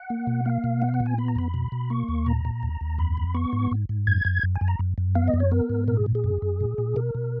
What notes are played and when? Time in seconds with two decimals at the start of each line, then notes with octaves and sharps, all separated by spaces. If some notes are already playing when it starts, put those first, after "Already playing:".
Already playing: F#5
0.10 A#3
0.27 B2
0.46 A#3 F5
0.64 B2
0.82 B3 F#5
0.88 F5
0.94 F#5
1.00 A#2
1.06 G#5
1.18 B3 B5
1.28 A#5
1.36 F2 B5
1.54 B2
1.72 B2
1.90 A#3 C#6
2.08 D#2
2.26 A#2 A#5
2.45 A#2
2.63 D#2
2.81 D#2
2.98 F2 B5
3.17 F2
3.34 B3 C#6
3.53 G#2
3.71 G#2
3.89 G#2
4.07 F#2 G#6
4.25 F#2
4.43 F#2
4.56 G#5
4.61 F#2
4.68 A#5
4.79 F#2
4.98 F#2
5.15 B3 F5
5.28 D#5
5.34 F#2
5.40 C#5
5.51 B3 A#4
5.70 G#2
5.88 A#2 A#4
5.97 G#4
6.06 A#2
6.15 G#4
6.24 F#2
6.42 F#2
6.60 A#2
6.78 A#2
6.96 B2 A#4
7.15 B2